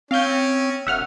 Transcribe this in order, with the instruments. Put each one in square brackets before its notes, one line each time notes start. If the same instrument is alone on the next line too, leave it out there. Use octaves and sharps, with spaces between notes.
[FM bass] C4 [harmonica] C#4 [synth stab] F5 G6
[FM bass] E1 [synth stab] E5 F#5 F6